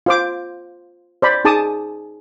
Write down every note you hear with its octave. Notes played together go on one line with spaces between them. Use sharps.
F4 C5 D6
C5 D5 B5
D#4 G#4 A5 D6 D#6